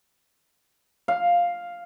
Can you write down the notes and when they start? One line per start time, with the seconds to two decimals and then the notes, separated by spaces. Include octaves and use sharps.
1.08 F5